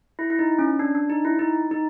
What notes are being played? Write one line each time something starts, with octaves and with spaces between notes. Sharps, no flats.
E4
E4
D#4
C#4
D4
D4
D#4
E4
D#4
D#4